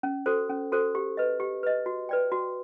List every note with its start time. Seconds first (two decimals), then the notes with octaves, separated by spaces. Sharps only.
0.03 C#4
0.26 F#4 A4 C5
0.49 C#4
0.72 F#4 A4 C5
0.95 G4
1.17 B4 D#5
1.40 G4
1.63 B4 D#5
1.86 F#4
2.09 B4 D5 G5
2.32 F#4